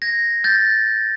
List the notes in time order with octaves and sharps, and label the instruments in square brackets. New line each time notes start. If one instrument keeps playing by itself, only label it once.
[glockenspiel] G#6 A#6
G6 A6